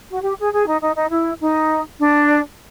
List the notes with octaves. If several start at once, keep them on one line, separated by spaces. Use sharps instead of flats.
F#4
G4
G#4
G#4
D#4
D#4
D#4
E4
D#4
D4